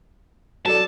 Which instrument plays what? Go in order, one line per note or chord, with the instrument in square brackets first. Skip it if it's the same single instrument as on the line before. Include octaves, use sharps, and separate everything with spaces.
[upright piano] F#3 A4 D5 [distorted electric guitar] A5